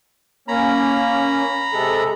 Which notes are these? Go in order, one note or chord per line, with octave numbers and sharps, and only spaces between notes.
A#3 C#4 A#5 B5
C3 G#3 A4